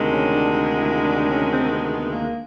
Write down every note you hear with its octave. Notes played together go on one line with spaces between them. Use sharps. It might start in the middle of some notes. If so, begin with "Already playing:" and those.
Already playing: D2 C3 D#3 G#3
C#4
D4
D#4
E4
D4
C#4
C4
B3
B3
A#3